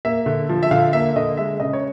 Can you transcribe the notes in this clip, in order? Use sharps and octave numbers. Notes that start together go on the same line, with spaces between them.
A#3 E5
D3
F3
E5
D3 F5
A#3 E5
D3 D#5
G#3 E5
C#3 D#5
C#5